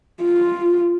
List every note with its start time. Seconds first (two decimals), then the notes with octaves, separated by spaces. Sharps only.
0.23 F4